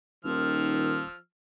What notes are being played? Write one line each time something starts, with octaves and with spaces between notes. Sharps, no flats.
D#1 D#3 F3 E6 F6